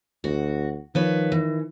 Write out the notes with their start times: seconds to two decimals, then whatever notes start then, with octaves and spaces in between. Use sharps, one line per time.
0.24 D2 F#4
0.95 D#3 F3 B4 C#5
1.32 E3